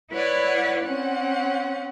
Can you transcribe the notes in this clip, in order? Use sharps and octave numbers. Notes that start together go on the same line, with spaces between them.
E4 B4 C#5 D5 F#5
C4 C#4 F#5